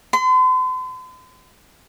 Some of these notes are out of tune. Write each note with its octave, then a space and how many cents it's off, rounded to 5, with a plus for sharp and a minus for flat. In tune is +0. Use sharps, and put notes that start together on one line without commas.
C6 -45